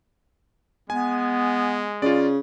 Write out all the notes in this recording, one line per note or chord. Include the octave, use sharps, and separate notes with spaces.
G#3 B3 G#5
C#3 F4 D5